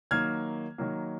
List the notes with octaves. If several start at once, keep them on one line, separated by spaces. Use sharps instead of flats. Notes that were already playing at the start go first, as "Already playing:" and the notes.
D#3 F#3 A#3 F6 G#6
D#3 F#3 A#3